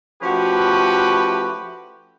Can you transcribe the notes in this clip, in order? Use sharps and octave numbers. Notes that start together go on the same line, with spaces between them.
F3 A3 C#4 F#4 G4 B4